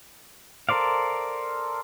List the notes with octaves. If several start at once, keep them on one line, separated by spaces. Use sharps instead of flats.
A4 A#4 C5 D5 F5